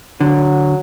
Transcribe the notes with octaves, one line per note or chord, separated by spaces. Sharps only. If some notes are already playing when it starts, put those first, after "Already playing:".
D3 F#3